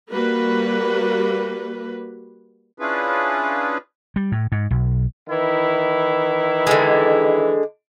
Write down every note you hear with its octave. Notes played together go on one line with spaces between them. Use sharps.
G3 A#3 F#4 B4
C#4 D4 E4 F4 G#4 B4
G3
A2
G#2
B1
D#3 E3 E4
D3 G#3